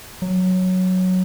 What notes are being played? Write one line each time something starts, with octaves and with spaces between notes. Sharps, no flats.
F#3